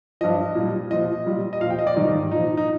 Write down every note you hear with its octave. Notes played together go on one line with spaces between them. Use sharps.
G2 F3 D#5
A#2 G3
A#2 F3 D#5
A#2 G3
D#5
A#2 F3 F5
G5
D#5
D5
G#2 D#3 G3 D#4
A#2 F3 D#4
D#4